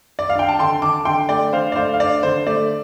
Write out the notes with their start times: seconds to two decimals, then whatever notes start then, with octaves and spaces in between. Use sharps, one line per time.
0.19 D5
0.29 F5
0.35 D4 G5
0.49 A5
0.59 D3 G5 C6
0.82 D3 A5 D6
1.05 D3 G5 C6
1.29 A3 D5 G5
1.53 D3 C5 F5
1.72 D5
1.76 A3 C5 F5
1.94 F5
2.00 D4 D5
2.23 D3 C5
2.47 A3 D5